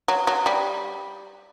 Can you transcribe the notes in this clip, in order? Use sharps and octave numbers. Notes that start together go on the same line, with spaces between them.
F#3
F#3
G3